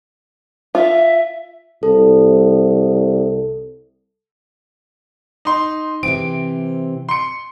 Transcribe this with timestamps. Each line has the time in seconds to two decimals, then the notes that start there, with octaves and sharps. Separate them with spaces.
0.75 F4 E5
1.83 C2 A4
5.45 D#4 C6
6.03 C3 E3 C4 D7
7.09 C6 C#7